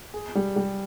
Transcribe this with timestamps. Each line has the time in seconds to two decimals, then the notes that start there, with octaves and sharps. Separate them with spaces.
0.14 G#4
0.35 G3
0.56 G3